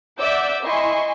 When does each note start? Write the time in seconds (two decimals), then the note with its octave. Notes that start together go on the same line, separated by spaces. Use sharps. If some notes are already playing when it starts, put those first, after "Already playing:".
0.18 D5 E5 F#5 D6 E6 G6
0.63 E4 D#5 G#5 C6 C#6